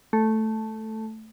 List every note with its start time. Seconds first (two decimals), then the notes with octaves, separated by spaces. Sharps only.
0.13 A3